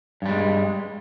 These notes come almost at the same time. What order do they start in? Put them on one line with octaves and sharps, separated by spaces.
G2 G3 G#3